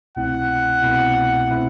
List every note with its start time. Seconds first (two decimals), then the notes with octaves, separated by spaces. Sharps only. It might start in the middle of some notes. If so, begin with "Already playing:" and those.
0.17 C2 B2 A3 C4 E4 F#5
0.82 C2 B2 A3 C4 E4
1.50 B2 A3 C4 E4